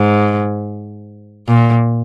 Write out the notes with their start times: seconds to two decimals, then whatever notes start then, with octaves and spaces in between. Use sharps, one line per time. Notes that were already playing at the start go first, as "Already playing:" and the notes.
Already playing: G#2
1.48 A#2